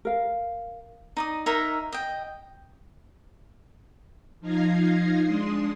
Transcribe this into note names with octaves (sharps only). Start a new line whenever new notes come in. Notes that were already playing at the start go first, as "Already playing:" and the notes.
A#4 F5
D#4 D5 D#6
D#4 A#4 C#5 E5
D#5 G5
F3 D#4 F5 G#6 A#6 C7
G#3 D4 C6 D#6